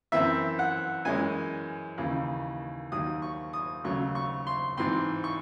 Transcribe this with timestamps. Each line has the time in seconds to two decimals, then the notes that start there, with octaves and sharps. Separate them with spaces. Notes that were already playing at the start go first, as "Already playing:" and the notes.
0.12 F#2 E3 C4 E5
0.59 F#5
1.05 F#2 E3 G#3 C#4 G#5
1.98 D#2 C#3 E3
2.91 D#2 D#3 F#3 D#6
3.22 C#6
3.53 D#6
3.84 D#2 C#3 F#3 A3 C#6
4.15 C#6
4.47 C6
4.77 G#2 E3 C4 C6
5.24 C#6